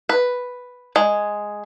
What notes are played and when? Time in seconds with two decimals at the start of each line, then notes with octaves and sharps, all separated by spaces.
0.09 B4
0.96 G#3